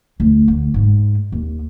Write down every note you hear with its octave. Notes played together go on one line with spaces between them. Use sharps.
D2
D2
G#2 G#3
D#2